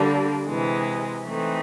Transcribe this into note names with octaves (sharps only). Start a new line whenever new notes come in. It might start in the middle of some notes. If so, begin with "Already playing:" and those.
Already playing: D3 G3 A#3 D4
C3 E3 G#3
E3 A3 C4 D#4